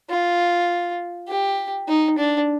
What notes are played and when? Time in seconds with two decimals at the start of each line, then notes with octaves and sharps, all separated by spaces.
0.10 F4
1.28 G4
1.88 D#4
2.18 D4